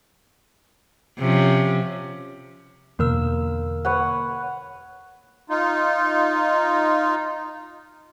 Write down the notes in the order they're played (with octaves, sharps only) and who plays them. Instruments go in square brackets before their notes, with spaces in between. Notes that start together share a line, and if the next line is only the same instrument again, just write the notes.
[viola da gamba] C3 F3 C#4
[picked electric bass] E2 B2 D3 [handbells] A#3 A#4 E6
[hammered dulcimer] B4 C#5 F#5
[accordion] D#4 F4